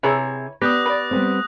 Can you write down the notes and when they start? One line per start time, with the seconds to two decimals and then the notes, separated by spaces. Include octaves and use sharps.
0.03 C3 E4 G#4 B4 C#5 A#5
0.62 G3 B3 G4 B4 D#6 F#6 A#6
0.86 B4 D5
1.11 G3 B3 C4